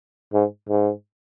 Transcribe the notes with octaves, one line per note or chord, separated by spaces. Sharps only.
G#2
G#2